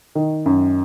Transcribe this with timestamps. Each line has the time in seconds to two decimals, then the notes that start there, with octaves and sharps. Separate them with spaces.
0.15 D#3
0.46 F#2